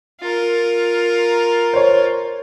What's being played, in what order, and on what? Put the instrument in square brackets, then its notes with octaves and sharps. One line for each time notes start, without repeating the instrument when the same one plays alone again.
[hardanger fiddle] F4 A#4
[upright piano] C5 C#5